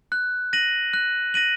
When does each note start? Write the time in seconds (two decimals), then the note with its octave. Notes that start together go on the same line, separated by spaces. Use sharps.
0.12 F#6
0.53 A#6 D#7 F#7
0.93 F#6
1.34 A#6 D#7 F#7